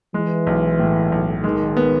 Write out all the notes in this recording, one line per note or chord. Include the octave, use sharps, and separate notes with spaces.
E3 G#3
B1
A2
B1
D#3 G#3
B3